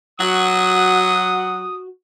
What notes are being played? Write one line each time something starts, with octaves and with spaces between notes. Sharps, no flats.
F#3 F#4 F#5 D#6